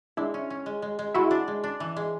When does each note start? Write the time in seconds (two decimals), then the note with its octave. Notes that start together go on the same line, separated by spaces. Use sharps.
0.17 G#3 D4 E4
0.34 C#4
0.50 C#4
0.66 G#3
0.82 G#3
0.99 G#3
1.14 G#3 E4 F#4
1.31 D4
1.48 G#3
1.64 D4
1.80 E3
1.96 G#3